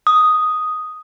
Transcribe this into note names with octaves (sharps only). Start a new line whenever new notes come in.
D#6